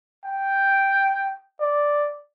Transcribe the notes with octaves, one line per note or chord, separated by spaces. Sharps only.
G5
D5